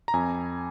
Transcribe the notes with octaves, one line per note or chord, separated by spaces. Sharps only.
A#5
F2 G#5